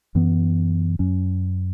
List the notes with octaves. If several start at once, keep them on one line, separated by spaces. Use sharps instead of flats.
F#2 E3 B3
F#2 F#3 C#4